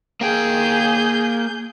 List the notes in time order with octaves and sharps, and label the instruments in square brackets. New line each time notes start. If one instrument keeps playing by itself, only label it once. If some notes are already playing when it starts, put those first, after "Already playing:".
[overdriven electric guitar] A#3 G5 [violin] G#4 G6